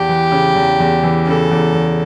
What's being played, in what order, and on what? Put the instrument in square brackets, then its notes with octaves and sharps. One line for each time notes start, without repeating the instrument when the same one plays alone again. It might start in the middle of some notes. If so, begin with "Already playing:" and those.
Already playing: [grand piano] E2 [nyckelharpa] G4
[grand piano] E3
C#3
E2
E2
E3
[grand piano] C#3 [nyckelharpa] A4
[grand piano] E2
E2